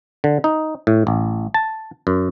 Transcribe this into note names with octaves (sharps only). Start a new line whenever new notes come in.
D3
D#4
A2
A1
A5
F#2